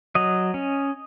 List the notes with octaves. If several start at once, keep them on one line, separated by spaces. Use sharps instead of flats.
F#3 D#5
C#4